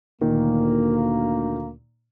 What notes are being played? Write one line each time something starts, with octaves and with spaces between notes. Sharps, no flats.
D2 A#2 D#3 A#3